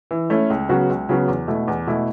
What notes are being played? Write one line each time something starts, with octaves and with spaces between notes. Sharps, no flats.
E3
A3 C#4 E4
C#2
C#3 F#3 B3 F#4
C#2
C#3 F#3 B3 F#4
E2
B2 A3 E4
E2
B2 A3 E4